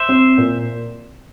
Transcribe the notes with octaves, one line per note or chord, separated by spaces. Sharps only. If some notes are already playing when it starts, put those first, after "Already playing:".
Already playing: C5 E5
C4
A#2